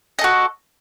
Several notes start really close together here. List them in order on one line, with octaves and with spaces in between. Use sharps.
D#5 A4 F#4